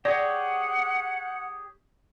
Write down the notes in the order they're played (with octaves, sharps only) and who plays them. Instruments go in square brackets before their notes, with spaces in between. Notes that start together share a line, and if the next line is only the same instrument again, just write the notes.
[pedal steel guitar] G4 G#4 C#5 [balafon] D5 [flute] F#5